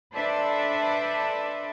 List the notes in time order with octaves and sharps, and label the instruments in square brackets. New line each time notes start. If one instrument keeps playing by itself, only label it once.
[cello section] D4 A4 B4 C5 D5 E5